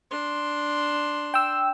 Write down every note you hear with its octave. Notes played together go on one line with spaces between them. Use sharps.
D4 C6
G5 E6